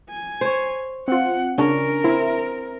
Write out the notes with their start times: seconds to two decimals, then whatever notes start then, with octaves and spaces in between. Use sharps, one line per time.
0.10 G#5
0.41 C5 C#5
1.08 C4 F4 F#5
1.58 C#3 C#4 D4 A#4
2.04 C4 E4